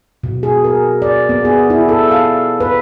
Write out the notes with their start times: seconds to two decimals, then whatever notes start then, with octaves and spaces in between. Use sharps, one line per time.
0.23 B2
0.43 G#4
0.64 A#4
1.02 D5
1.29 B3
1.45 G#4
1.70 E4
1.89 A4
2.11 F5
2.60 B4